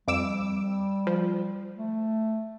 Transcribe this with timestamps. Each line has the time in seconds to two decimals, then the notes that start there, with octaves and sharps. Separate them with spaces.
0.08 F2 G3 D6 E6
1.07 F3
1.76 A3